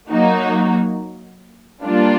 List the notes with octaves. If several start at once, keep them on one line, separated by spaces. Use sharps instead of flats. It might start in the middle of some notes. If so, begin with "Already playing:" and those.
F#3 A#3 D#4 F#4
G3 A#3 D4 F4